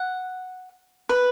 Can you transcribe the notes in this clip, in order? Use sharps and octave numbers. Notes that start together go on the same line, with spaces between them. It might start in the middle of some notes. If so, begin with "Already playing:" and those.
Already playing: F#5
B4